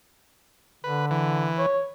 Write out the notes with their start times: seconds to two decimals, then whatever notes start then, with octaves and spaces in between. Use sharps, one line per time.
0.84 D3 B4
1.11 E3
1.58 C#5